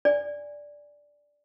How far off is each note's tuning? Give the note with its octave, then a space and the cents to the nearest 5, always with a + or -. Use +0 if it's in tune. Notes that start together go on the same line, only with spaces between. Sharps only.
D5 -5 G#5 -20